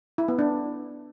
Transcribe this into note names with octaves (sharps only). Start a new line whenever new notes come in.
E4
B3
D4